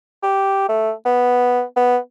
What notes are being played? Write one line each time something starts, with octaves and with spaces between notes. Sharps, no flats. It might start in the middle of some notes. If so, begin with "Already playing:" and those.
G4
A3
B3
B3